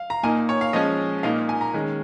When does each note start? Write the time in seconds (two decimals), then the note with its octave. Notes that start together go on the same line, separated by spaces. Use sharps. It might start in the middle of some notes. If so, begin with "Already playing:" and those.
Already playing: F5
0.10 A#5
0.23 A#2 A#3 D#4 G#5
0.49 C#5
0.61 F5
0.73 F3 G#3 C#4 D#5
1.23 A#2 A#3 D#4 F5
1.49 G#5
1.61 A#5
1.74 D#3 G#3 C#4